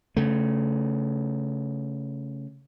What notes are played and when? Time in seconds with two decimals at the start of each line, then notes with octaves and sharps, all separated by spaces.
0.17 C#3 A3